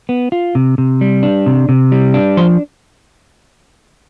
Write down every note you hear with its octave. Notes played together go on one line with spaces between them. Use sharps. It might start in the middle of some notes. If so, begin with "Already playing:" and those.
B3
F4
C3
C3
G3
D4
C3
C3
G3
D4
F3 C5